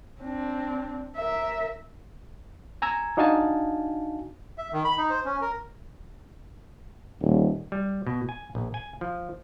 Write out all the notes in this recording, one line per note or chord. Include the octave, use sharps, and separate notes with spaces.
C4 D4
A#4 E5
G#5 A#5 E6 G#6
D4 D#4 F#4 F5 G#5 A5
E5
D#3
B5
D#4
C5
C#4
A#4
D#1
G3
B2
G#5
A#1
G#5
F3